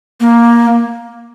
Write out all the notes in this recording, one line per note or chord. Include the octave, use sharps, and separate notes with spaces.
A#3